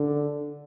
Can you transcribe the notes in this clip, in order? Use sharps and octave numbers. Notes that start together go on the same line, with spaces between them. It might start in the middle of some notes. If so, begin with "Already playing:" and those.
Already playing: D3